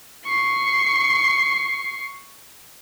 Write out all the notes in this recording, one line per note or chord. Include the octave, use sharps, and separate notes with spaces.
C#6 C7